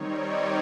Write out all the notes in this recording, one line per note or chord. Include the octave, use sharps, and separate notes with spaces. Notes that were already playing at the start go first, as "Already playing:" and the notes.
Already playing: D#3 G3 C4 D#4 C#5
D5